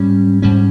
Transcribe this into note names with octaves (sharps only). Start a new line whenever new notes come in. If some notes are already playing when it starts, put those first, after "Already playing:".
Already playing: G#2 G3 C#4
G#2 G3 C#4